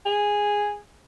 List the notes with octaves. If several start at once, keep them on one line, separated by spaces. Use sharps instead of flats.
G#4